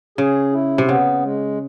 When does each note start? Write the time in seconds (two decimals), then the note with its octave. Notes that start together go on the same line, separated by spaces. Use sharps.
0.18 C#3 G#4
0.53 E4
0.78 C3
0.88 C#3 B3
1.23 G#3